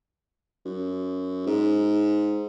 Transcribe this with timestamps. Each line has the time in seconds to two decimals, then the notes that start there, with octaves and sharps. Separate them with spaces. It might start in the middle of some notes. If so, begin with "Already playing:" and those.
0.65 F#2
1.46 G#2